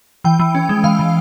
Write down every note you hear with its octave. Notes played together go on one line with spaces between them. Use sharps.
E3 G5
E3
C#4
G#3
E3 F5
E3